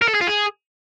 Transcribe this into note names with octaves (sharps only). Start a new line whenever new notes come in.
A#4
A4
G#4
F4
G#4